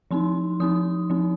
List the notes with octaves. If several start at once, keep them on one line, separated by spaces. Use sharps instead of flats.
F3 C4 D#4 C6
F3 C4 D#4 D#6
F3 C4 D#4